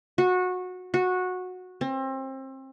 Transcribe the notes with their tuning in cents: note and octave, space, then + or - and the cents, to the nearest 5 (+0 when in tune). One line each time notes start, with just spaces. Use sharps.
F#4 -20
F#4 -15
C4 +30